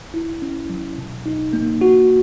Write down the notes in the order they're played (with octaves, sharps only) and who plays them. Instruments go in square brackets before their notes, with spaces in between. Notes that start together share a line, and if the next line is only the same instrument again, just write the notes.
[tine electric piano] E4
C#4
F#3
B2
D#4
A#3
F#4